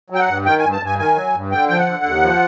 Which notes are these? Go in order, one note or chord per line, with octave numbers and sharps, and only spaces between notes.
F#3 G5
F#5
G2
D#3 G5
G#5
G2
A5
G2 G#5
D#3 G#5
F#3
G2
D3 G5
F3 G5
F#5
D3
D#2
F3